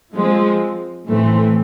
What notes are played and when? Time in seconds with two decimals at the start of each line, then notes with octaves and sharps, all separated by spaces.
0.14 F3 G#3 C4
1.07 A2 E3 A3 C4